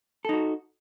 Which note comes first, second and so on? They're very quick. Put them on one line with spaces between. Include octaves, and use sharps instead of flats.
A4 D#4 F#4